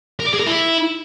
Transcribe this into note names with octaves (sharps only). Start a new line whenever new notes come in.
A#4
D5
G#4
A#4
E4